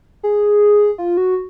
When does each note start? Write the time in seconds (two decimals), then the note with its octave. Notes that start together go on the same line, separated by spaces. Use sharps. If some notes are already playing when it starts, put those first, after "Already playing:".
0.23 G#4
0.98 F4
1.17 F#4